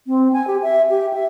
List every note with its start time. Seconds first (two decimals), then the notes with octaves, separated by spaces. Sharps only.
0.07 C4
0.33 G#5
0.47 G4
0.62 E5
0.90 G4
1.14 E5